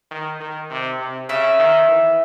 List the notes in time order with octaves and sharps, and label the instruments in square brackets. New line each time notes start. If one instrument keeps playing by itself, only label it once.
[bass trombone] D#3
D#3
C3
C3
[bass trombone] C#3 [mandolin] E5
[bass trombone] D#3
E3